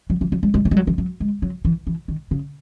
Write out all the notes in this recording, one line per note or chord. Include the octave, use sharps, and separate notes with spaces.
F#3
E3
F#3
G#3
G#3
A3
G#3
F#3
E3
F#3
G#3
F#3
E3
E3
D#3
C#3